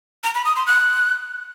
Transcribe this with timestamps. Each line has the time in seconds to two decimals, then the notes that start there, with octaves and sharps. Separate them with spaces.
0.24 A#5
0.35 B5
0.45 D#6
0.56 C6
0.67 F#6